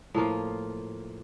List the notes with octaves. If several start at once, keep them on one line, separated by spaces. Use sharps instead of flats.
A2 F3 A#3 F4